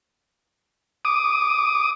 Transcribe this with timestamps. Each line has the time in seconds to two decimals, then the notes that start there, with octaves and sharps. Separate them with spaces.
1.05 D6 D#6